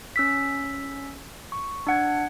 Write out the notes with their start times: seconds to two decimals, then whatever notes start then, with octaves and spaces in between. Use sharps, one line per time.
0.16 C#4 E6 B6
1.52 C#6
1.87 D4 F#5 G#6